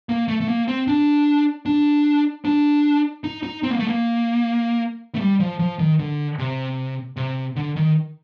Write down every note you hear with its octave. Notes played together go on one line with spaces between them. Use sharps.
A#3
A3
A3
A#3
C4
D4
D4
D4
D#4
D#4
C4
A#3
A3
A#3
A3
G3
F3
F3
D#3
D3
C3
C3
D3
D#3